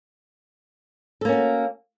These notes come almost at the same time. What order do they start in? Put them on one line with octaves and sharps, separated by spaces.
A4 A#3 C#4 F#4